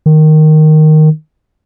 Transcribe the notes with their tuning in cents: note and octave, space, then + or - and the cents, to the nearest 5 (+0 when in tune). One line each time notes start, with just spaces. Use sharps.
D#3 -5